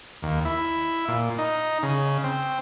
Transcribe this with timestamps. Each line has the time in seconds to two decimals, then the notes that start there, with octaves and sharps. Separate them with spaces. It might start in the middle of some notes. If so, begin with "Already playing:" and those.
0.22 D#2
0.45 E4
1.08 A#2
1.38 D#4
1.83 C#3
2.24 C4